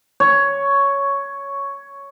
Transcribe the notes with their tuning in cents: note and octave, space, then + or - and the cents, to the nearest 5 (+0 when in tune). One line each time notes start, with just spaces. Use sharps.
C#5 +5